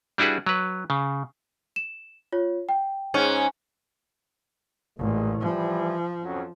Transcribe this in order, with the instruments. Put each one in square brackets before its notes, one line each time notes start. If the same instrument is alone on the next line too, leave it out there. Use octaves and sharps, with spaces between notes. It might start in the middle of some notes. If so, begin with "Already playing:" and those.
[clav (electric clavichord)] G3 D4 E4 F#4 G#4 B4
F#3 B4
C#3
[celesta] E7
F4 C#5
G5
[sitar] G#2 C#4
[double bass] A1 [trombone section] A#2 G#3
[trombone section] E3 G3 [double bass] F3
[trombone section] F2 F#3 C#4